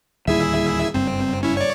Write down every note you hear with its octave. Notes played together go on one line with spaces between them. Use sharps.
D1 D#2 G3 E4 G#4 E5
F#1 G2 C4
C#4 E4
C#5 D5